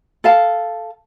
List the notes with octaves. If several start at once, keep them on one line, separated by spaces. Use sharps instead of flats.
A4 F5 A5